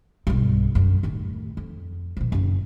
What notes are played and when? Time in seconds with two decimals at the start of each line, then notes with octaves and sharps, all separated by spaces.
0.27 B1 G2
0.75 F#2
1.03 D#2 A2
1.57 F2
2.17 A#2 F3
2.32 F#1 C#3